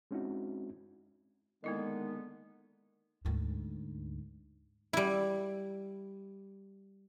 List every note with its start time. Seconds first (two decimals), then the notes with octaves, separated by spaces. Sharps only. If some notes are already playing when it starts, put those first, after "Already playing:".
0.11 G#3 C4 C#4 D#4 E4 F#4
1.64 D3 D#3 G#3 A#3 B3 E4 D#5
3.25 D2 G#2
4.93 G3 E4